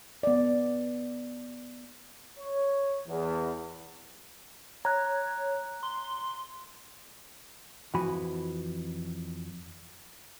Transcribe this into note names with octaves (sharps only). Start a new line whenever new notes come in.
B3 D5
C#5
E2
C#5 A#5 F#6
C6
F2 E3 F3 F#4 G#5 B5